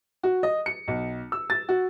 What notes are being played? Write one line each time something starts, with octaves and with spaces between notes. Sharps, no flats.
F#4
D#5
C#7
B1
E6
A6
F#4